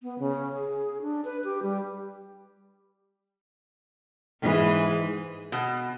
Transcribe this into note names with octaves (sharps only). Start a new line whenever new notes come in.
B3
C#3
G#4
D4
B4
G4
G3
G#2 E3 G#4
B2